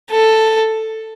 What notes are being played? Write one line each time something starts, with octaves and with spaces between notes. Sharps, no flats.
A4